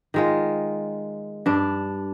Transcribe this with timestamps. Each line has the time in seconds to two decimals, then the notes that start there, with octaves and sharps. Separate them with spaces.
0.14 D#3 G#3 F4
1.46 G2 D4